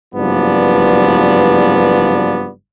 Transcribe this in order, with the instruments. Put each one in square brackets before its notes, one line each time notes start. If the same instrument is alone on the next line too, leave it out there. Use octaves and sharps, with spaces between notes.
[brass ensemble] F#1 G2 F3 B3 D5